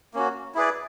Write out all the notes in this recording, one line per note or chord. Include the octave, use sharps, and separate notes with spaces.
A#3 C#4 F#4
E4 G#4 B4 D5